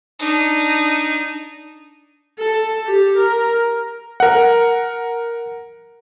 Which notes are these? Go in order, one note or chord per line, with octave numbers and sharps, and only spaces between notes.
D4 D#4
A4
G4
A#4
A#4 F#5